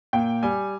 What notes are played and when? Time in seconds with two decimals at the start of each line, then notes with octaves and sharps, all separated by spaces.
0.13 A#2 G5
0.43 G3 G#5